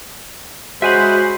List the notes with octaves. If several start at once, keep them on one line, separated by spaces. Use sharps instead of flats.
G#3 C#4 F#4 C5 E5 G#5 B5